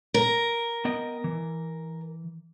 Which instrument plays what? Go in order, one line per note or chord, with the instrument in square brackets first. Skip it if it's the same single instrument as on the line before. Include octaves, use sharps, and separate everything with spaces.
[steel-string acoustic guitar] A#4
[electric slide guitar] B3 D#5 G5
E3